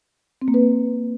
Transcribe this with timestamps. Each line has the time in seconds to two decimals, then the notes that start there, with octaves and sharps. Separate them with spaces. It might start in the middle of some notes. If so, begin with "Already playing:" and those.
0.42 C4
0.48 A#3
0.54 B4